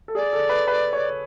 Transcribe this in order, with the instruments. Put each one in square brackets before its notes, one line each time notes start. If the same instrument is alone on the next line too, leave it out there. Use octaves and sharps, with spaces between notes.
[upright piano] A4
[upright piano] G#4 [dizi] D5
[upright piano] A4
B4
B4
C#5